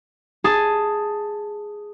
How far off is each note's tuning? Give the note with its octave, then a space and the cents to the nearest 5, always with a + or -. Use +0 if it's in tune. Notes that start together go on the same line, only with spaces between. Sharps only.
G#4 +0 A5 +5